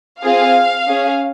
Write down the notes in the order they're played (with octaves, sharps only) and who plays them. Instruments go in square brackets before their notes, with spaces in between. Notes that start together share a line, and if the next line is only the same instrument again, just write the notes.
[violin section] C4 F4 G#4 F5
C#4 G#4